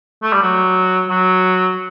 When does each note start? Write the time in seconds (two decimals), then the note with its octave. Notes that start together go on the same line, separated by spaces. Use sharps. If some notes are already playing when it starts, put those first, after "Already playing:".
0.23 A3
0.33 G3
0.42 F#3
1.10 F#3